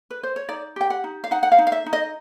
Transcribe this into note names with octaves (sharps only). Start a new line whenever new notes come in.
B4
C5
C#5
D#4 D5
G4 G5
F#5
D#4
F5
D#4 F#5
F#5
F5
D#4
F5
E5
D#4
D#5